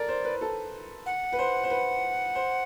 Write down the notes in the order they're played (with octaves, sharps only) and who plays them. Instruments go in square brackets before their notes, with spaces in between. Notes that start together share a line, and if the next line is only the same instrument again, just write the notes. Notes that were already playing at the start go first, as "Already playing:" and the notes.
Already playing: [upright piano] A4 A#4 [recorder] D5
[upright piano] C5
B4
A4
[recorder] F#5
[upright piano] B4
C5
C5
B4
C5